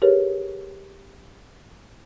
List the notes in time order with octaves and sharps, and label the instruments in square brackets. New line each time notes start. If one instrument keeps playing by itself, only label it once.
[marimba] G4 G#4 A#4 B4 C#5